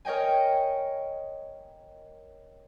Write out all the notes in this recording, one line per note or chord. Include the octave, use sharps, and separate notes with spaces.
A#4 C#5 D#5 G5 G#5